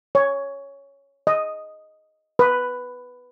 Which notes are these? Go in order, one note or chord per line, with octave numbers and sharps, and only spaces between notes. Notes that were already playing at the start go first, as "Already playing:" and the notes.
C#5
D#5
B4